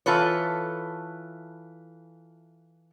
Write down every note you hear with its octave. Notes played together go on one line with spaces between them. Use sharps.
E3 F4 A4 B4 C#5